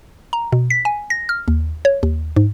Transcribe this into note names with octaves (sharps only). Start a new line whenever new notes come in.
A#5
B2
B6
G#5
A#6
F6
D#2
C#5
D#2
G#2